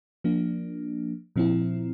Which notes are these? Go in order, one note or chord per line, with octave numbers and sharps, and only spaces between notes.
F3 A#3 D4
A#2 F3 C4 E4